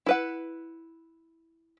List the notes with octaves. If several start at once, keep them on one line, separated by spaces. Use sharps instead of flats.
E4 B4 F#5